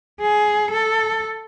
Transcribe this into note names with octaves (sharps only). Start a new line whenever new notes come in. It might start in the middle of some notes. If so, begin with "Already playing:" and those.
G#4
A4